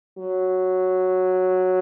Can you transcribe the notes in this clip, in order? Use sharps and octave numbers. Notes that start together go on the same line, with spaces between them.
F#3